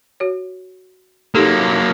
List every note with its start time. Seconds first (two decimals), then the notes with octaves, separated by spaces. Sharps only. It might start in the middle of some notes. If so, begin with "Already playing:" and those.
0.20 F#4 C#5
1.35 F#3 A#3 D#4 G4 A4